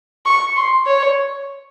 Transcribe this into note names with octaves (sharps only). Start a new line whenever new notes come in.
C#6
C6
C#5